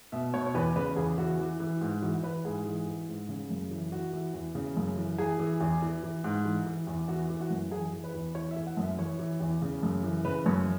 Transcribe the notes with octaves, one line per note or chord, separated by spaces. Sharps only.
B2 E5
B2 C#5
C#5
E2 B4
C#3 B4
E2 G#4
E3 F#4
E3
E3
G#2
E3 F#4
E3 B4
G#2 G#4
E3
E3
G#2
C#3
F#2
E3
E3 F#4
E3
E2
C#3
F#2
E3
E3 G#4
E3
E2
E3
E3
G#2
E3
E3
E2
E3 F#4
E3
F#4
F#2
E3 G#4
E3
B4
E2
E3 C#5
E5
E3
F#5
F#2
E5
E3 C#5
E3
E2
C#3
F#2
E3
C#3 B4
F#2 C#5